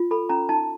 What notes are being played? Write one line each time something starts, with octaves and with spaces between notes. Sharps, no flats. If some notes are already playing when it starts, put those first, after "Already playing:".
Already playing: F4
A4 B5
C#4 A#5
D#4 A5